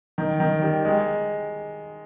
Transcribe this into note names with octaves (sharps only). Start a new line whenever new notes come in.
D#3
D#3
G3
G#3